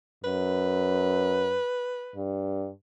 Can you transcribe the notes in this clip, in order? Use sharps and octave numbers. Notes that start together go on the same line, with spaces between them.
F#2 B4
G2